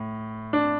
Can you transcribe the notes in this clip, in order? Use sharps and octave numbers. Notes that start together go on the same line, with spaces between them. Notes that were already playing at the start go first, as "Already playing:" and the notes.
Already playing: A2
D4